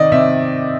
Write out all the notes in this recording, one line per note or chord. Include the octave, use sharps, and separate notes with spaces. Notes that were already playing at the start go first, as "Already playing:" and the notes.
Already playing: C3 D#3 D5 D#5
C3 E5